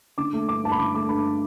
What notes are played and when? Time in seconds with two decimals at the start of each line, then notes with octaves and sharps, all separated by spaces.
0.18 D3 D6
0.33 A3
0.48 G2 D6
0.63 G2 A5
0.72 B5
0.79 D3 D6
0.95 A3 D6
1.09 G2 B5